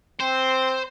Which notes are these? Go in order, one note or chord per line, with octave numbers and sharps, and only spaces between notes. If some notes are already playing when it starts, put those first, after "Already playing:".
C4 C5